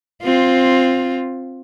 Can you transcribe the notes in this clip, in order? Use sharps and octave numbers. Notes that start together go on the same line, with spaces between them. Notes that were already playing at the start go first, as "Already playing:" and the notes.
C4 F4